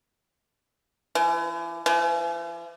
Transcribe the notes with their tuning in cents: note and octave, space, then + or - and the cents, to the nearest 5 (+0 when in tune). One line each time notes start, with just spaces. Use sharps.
E3 +40
E3 +45